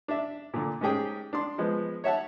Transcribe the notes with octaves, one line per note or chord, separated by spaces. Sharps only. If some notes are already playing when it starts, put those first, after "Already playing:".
D4 E5
A#2 D3
G#2 C#4 G4 G#4 G5
D4 C6
F3 G#3 B3
C#5 E5 F#5 A5